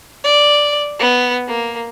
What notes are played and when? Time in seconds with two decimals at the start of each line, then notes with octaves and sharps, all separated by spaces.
0.24 D5
0.99 B3
1.47 A#3